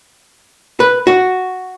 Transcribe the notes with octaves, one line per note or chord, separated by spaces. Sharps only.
B4
F#4